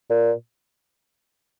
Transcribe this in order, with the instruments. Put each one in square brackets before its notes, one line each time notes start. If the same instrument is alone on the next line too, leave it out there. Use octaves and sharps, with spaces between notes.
[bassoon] A#2